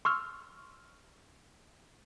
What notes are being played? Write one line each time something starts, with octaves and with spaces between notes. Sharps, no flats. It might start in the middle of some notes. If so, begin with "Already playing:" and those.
C6 C#6 E6 F6